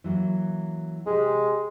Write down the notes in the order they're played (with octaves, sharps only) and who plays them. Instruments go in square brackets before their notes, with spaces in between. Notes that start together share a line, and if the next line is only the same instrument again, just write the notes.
[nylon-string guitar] E3 F#3 A#3
[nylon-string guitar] C3 G4 G#4 [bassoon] G#3